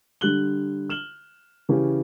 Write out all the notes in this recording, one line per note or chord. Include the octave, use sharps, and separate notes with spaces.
D3 G3 G4 F#6 F#7 G7
F6 E7 F#7 G7
C#3 E3 C#4 G4